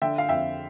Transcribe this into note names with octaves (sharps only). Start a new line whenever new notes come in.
D3 E5 G5
F5
F2 E5 G5